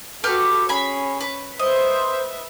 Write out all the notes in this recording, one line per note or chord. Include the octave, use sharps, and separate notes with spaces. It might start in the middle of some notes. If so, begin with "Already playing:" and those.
F#4 G4 A4 B4 F6
C#4 G#4 B5
B4
B4 C5 D#5 E5